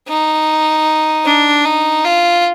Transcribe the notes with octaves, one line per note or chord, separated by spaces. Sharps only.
D#4
D4
D#4
F4